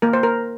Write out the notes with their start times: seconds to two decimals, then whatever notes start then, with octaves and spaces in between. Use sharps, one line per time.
0.02 A#3 A#4
0.13 C5
0.23 A#4